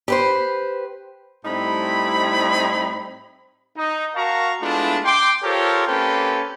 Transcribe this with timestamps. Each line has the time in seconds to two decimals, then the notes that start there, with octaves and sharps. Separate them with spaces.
0.08 G4 B4 C5
1.45 A2 G3 C4 D#4 E4 B5
3.76 D#4
4.16 F#4 A#4 F5 A5 A#5 C#6
4.61 G#3 A3 B3 D4 E4 F4
5.05 G5 C6 D6
5.43 F4 G4 A4 A#4 C5 C#5
5.87 A#3 C4 C#4 G4 A4 B4